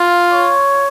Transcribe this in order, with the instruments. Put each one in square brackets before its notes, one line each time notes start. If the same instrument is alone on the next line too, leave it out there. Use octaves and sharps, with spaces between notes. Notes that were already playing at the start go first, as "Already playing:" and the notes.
Already playing: [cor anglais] F4
[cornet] C#5